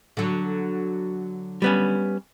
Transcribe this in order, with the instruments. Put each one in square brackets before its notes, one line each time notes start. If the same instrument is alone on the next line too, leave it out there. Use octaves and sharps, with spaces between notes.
[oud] D3 F#3
[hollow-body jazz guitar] G3 B3 C#4